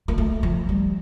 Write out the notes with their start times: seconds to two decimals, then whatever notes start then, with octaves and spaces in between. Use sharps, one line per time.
0.08 A#3
0.18 A3
0.43 F3
0.69 G3